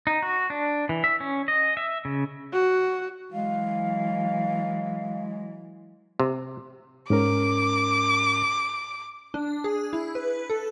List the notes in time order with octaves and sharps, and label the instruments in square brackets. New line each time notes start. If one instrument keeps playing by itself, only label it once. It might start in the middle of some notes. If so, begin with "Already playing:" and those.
[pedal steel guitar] D#4
F#4
D4
E3
E5
C#4
D#5
E5
C#3
[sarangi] F#4
[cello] E3 F#3 [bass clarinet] G#3 [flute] F5
[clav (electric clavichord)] C3
[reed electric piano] G#2 C#4 A#4 [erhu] D6
[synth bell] D4
G#4
E4
B4
A4